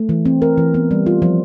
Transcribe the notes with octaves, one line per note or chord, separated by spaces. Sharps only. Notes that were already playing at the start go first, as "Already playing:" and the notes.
Already playing: A3
E3
C4
A#4
E3
B3
G3
F4
F3